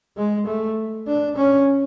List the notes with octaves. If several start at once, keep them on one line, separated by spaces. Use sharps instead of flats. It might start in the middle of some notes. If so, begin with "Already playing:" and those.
G#3
A3
D4
C#4